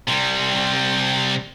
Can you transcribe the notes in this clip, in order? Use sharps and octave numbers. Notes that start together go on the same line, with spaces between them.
C3 G3